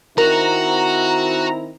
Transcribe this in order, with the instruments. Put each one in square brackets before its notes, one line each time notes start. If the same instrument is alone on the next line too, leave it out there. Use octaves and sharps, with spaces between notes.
[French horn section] D#3 C4 E4 [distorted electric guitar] F#4 [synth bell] A#4 [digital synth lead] A#5